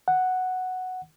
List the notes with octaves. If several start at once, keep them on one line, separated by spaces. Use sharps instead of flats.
F#5